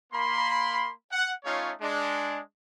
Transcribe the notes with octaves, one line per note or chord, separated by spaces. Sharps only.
A#3 B5 C6
F#5
A3 C#4 D#4 F4 C#5 F5
G#3 D4